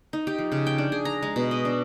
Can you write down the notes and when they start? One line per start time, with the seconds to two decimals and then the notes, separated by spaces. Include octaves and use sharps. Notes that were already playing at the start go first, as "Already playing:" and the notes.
0.13 D#4
0.27 G4
0.38 F3
0.52 C#3
0.67 G5
0.78 D4
0.92 G#4
1.05 A#5
1.22 G#3
1.36 B2
1.51 D#5
1.65 D4